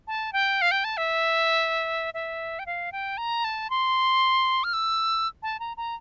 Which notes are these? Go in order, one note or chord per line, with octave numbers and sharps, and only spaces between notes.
A5
G5
F5
G5
A5
E5
E5
G5
F5
G5
A#5
A5
C6
F6
E6
A5
A#5
A#5